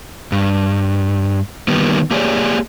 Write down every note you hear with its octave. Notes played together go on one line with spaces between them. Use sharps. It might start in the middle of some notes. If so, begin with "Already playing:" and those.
G2
D#3 G3 A#3 B3
A#3 G4 G#4 C#5 D5